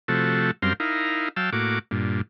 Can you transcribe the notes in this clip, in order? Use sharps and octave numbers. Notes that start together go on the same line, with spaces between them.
C3 F3 A3 F#4 A4
F#2 G3 C4 A#4 F5 C6
D#4 E4 A#4 F5
F#3 F5 G5 A5 E6
A2 A#3 F#4 D6
G2 A#2